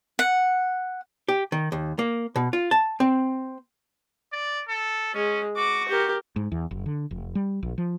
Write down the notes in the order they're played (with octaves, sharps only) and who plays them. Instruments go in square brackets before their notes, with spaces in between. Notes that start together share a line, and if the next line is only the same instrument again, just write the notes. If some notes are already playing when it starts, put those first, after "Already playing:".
[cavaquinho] F#5
[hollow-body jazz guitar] G4
D#3
D#2
A#3
B2
F4
A5
C4
[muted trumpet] D5
A4
[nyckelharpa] G#3 [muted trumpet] C#4
[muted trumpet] F#4 [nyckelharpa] D6
[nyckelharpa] G4 A#4
[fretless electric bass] G#2
E2
F#1
D3
F1
G3
A#1
F3